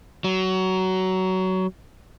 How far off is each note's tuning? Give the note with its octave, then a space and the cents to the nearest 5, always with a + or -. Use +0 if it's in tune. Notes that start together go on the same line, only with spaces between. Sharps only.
F#3 +20